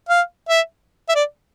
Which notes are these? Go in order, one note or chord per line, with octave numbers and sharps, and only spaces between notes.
F5
E5
E5
D5